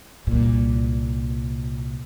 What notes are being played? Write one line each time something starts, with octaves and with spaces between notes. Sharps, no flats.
C2 A#2